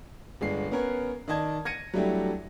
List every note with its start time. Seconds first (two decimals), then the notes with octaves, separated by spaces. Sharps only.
0.41 G1 G#3 D4 C7
0.71 B3 C#4 A#4 B4 C#5
1.28 D#3 D5 D#5 A5 G#6
1.65 G#6 A#6 C#7 D#7
1.94 F#3 G3 A3 D4 E4 G4